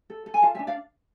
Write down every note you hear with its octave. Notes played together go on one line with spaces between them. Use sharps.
A4
A4
G#5
F4 F5 A5
E5 G#5
D4
D5 F5